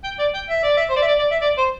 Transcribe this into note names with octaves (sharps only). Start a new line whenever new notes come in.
G5
D5
G5
E5
D5
E5
C5
D5
E5
D5
D5
E5
D5
C5